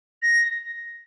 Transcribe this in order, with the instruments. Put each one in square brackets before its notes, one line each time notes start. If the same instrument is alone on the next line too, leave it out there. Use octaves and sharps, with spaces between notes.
[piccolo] A#6